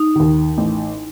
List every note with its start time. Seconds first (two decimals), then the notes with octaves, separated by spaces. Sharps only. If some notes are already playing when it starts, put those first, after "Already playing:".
Already playing: D#4
0.16 D#2 D#3
0.57 A1